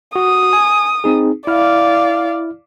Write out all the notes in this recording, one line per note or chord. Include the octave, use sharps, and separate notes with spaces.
F#4 D#6
G#5
C4 D#4 G#4
E4 D5 F5 F6